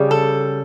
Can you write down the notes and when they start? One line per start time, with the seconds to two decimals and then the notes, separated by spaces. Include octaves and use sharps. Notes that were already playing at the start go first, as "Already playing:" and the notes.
Already playing: C#3 G3
0.11 A4